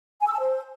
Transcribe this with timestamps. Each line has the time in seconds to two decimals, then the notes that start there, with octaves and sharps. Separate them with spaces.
0.21 G#5
0.27 E6
0.33 A5
0.39 C5